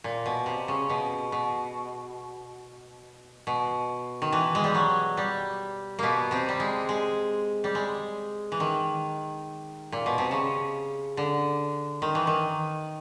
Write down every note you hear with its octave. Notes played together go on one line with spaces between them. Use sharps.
A#2
B2
C3
C#3
B2
B2
B2
D#3
E3
G#3
G3
F#3
G3
B2 A#3 B3
C3 C4
G3
G#3
G#3
G3
G#3
E3
D#3
A#2
B2
C3
C#3
D3
D#3
E3
D#3